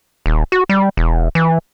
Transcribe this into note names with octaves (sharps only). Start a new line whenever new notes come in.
D#1
F#4
G3
E1
E3